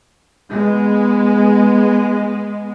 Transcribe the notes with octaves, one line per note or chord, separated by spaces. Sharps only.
G#3 B3